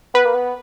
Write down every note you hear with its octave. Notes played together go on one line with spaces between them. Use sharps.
B3 B4
A#3
B3